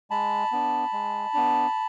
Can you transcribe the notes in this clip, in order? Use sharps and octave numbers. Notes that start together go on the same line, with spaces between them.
G#3 A5 B5
B3 D4
G#3
B3 D4